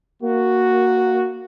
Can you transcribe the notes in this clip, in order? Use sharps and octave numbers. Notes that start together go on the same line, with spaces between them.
A#3 F#4